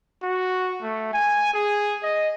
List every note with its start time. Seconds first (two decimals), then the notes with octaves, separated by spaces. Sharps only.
0.22 F#4
0.82 A3
1.13 G#5
1.54 G#4
2.03 D#5